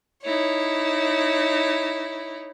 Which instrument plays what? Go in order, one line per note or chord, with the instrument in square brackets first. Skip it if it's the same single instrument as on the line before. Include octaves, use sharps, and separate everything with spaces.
[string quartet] D#4 E4 C#5